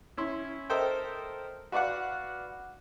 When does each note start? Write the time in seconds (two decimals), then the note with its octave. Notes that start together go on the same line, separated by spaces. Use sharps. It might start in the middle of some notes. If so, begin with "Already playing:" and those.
0.17 C#4 E4 C6
0.70 A4 A#4 C5 D#5 E5 G5
1.72 F#4 B4 D5 F5 F#5